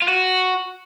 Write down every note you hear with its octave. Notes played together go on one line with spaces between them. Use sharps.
F4
F#4